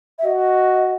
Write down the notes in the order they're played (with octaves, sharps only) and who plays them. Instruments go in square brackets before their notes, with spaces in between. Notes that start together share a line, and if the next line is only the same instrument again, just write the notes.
[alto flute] E5
[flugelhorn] F#4 [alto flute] D#5